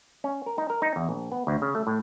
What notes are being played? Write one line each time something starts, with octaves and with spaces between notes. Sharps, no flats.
C#4
A#4
D#4
A#4
D#4
E2
A#1
B3
D2
C#3
A3
A2